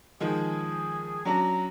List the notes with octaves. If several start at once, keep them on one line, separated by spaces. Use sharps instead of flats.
D#3 F3 G#3 G#4
F#3 C#4 D4 A#5